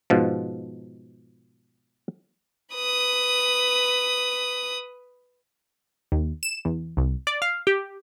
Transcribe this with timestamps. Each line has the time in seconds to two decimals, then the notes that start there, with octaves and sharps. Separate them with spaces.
0.10 G#2 B2 F3
2.74 B4 D#6
6.12 D#2
6.43 E7
6.65 E2
6.97 C2
7.27 D5
7.42 F5
7.67 G4